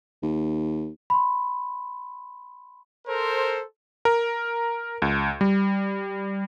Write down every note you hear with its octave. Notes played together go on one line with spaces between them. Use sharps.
D#2
B5 C6
A4 A#4 C5
A#4
C#2
G3